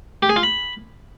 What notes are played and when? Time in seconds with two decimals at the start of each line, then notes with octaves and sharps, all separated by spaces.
0.22 G4
0.29 G#4
0.36 F4
0.43 B5